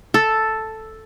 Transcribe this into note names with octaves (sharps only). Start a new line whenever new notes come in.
A4